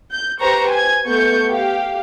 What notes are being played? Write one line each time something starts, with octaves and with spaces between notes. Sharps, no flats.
G6
G4 B4 C5 A#5 C#6
G#5 G#6
A3 B3 C#6 G6
G4 F5